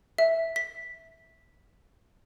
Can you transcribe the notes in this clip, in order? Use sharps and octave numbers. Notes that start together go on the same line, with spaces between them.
E5
B6